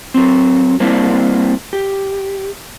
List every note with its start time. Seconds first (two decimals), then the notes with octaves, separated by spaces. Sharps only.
0.14 F#3 C4
0.80 G3 A#3 C4 D4 E4
1.73 G4